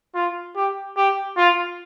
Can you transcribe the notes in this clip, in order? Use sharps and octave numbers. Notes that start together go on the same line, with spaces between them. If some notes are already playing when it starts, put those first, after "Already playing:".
F4
G4
G4
F4